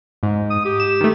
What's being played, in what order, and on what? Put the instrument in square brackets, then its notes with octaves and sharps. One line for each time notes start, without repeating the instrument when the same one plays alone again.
[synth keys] G#2
[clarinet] D#6
G4
[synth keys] E7
D#3 A3